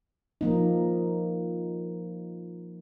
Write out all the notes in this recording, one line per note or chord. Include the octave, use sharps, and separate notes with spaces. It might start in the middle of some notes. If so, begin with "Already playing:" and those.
F3 A#3 D#4